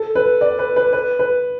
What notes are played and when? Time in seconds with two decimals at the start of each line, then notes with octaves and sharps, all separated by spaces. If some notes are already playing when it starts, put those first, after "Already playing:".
Already playing: A4
0.15 B4
0.41 D5
0.59 B4
0.76 B4
0.93 B4
1.19 B4